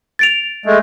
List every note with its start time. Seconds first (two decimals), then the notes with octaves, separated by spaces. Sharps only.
0.19 A6 D7 F7
0.66 G#3 A3